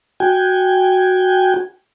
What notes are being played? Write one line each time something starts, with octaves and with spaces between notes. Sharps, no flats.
F#4 G5 G#5